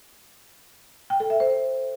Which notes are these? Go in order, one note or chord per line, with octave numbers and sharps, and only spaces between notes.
G5
A4
E5
C5